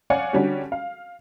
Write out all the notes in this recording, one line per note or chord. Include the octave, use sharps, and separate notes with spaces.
C#5 D5 F5 F#5 G#5
D3 G3 C#4 D4 F#4 G4
F5